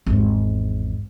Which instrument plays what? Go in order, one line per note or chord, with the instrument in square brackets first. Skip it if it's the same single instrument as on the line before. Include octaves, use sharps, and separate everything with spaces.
[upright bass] G#1 E2